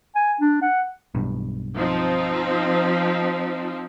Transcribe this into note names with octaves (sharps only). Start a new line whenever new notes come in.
G#5
D4
F#5
B1 G2
F3 C4 D#4